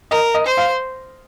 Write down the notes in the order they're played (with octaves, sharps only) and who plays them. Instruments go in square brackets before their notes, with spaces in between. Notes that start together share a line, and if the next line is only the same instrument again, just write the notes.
[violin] A#4 [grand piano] D#5
[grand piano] D#5
[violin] C5
[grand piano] F5